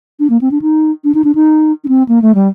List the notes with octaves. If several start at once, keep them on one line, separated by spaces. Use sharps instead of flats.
D4
A#3
C4
D4
D#4
D4
D#4
D4
D#4
D4
C4
A#3
A3
G3